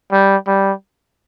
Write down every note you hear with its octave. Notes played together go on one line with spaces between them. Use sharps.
G3
G3